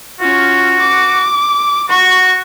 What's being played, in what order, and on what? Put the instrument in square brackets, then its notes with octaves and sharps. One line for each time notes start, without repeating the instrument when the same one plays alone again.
[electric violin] C#4 F4 [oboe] F#4
[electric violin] D6
[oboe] F#4 [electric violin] C#6